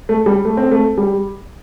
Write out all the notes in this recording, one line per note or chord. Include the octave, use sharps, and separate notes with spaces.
A3
G3
A3
C4
A3
G3